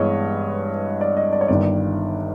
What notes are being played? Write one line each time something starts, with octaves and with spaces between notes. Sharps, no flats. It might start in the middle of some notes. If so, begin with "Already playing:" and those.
Already playing: G2 E3 G#3 B3 D4 C#5 D#5
D5
D#5
D5
C#5
G1 G2 D#3 D5